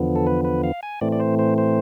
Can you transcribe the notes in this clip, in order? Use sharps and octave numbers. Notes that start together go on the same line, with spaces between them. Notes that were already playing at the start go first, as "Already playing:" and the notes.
Already playing: E2 D3 F3 B3
A4
B4
B4
F5
G#5
A2 E3 A3 C4 D5
D5
C5
C5
C5